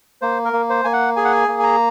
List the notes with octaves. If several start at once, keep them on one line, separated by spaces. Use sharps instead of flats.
A#3 C5
A#4
A#3
C5
A#3 G#5
F#5
G#4 G#5
F#5
G#5
A#3
G#5
A#5